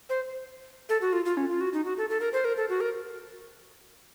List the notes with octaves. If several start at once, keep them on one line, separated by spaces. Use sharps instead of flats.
C5
A4
F#4
F4
F4
C#4
F4
F#4
D#4
F#4
A4
A4
A#4
C5
A#4
A4
F#4
A#4